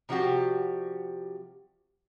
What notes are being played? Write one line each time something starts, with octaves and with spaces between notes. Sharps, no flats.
C3 F3 G3 F#4 G4